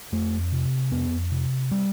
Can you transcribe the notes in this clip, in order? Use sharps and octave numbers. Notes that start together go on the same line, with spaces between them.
F2 A3
C3
F2 B3
C3
G3